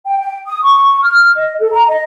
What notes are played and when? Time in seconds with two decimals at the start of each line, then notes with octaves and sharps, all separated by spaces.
0.06 G5
0.19 G5
0.47 D#6
0.63 C#6
1.03 F6
1.36 D#5
1.59 A4
1.72 A#5
1.87 D#5